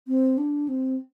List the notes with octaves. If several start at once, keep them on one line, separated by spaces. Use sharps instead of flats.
C4
D4
C4